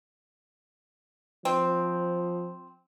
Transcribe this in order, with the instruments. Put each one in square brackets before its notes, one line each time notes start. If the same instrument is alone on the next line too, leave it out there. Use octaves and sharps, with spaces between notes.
[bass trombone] F3 [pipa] C4